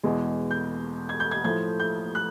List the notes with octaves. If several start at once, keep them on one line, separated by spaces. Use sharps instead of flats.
E2 B2 G#3
G6
G#6
G6
G#6
A2 F3 A3 G#6
G6
F#6